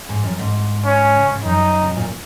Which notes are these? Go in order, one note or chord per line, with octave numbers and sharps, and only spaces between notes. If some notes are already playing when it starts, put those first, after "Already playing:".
G#2
F#2
G#2
C#4
C#3
G#2
F#2 D#4
C#3
B2
A#2